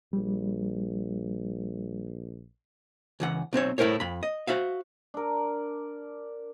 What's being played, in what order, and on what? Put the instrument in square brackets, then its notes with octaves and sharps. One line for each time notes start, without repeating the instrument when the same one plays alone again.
[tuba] A#1 [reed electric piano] G3
[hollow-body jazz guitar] C#2 E3 F#5
B1 C4 C5 C#5
A2 E4 A#4 C5 C#5
F2 B5
D#5
F#4 C5 E5 F5
[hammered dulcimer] D4 A#4